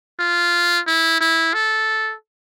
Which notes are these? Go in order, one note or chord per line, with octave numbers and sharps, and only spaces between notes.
F4
E4
E4
A4